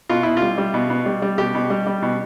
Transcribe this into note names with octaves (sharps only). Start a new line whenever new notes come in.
B2 F4
B2 E4
F4
G3
G3
B2
B2
G3
G3
B2 G4
B2
G3
G3
B2